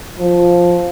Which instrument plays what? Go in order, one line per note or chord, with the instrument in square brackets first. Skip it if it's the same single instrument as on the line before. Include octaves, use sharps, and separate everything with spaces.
[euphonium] F3